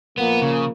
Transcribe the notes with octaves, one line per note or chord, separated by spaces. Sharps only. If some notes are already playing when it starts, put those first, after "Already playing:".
A#2 F3 A#3 B3
C#3